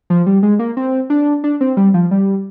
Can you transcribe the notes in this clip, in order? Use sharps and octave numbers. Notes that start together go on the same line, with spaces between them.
F3
G3
G#3
A#3
C4
D4
D4
C4
G3
F3
G3